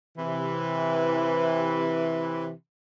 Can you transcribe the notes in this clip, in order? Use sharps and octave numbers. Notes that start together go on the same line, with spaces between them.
C3 E3